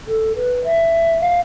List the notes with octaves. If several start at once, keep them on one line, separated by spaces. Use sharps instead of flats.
A4
B4
E5
F5